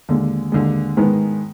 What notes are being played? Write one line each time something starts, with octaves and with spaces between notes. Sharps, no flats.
D#2 D3 G#3
D#2 D3 G#3
G#2 D#3 G#3 B3